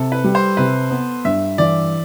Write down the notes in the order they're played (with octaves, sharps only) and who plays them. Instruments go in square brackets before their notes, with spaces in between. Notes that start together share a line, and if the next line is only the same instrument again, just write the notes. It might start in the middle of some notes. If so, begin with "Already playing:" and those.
Already playing: [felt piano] C3 [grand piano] A4
[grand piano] B4
[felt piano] G3
[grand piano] C5
[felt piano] C3 [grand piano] B4
[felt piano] B3
[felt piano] G2 [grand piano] E5
[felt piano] E3 [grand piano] D5